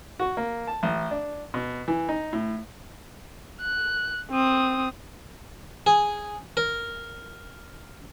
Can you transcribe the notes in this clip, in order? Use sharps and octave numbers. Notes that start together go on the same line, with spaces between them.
F#4
A#3
A5
A1
D4
B2
E3
D#4
A2
F#6
C4 D#6
G#4
A#4